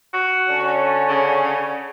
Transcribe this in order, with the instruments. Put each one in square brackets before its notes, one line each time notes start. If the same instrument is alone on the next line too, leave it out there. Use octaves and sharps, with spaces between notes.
[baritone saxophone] F#4
[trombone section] D3 C#4
[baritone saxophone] C#3